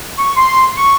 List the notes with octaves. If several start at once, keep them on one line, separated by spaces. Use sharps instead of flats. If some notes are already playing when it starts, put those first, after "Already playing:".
C#6
C6
C#6